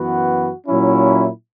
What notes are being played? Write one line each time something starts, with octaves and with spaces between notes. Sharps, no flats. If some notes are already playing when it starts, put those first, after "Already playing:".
Already playing: F#2 E3 B3 F#4
A#2 F#3 C#4 E4